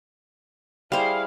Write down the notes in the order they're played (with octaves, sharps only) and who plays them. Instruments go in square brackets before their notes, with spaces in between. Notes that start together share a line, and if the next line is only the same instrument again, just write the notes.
[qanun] G3 C5 [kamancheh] E4 G#4 [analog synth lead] F5